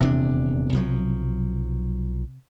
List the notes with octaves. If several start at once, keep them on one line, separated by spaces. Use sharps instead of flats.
D#1 E2 C3 D4
B1 F3 F#3